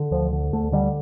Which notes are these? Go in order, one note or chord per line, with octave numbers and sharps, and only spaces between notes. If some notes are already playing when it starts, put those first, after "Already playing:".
Already playing: D3
D2 F3
D3
D2 A3
D3 G3